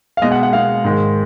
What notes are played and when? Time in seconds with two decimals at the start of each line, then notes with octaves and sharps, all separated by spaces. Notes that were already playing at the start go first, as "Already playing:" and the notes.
0.17 F5
0.22 B2 G#3 D#5
0.32 F#5
0.43 F#5
0.53 B2 G#3 F5
0.84 G#2 D#3 G#3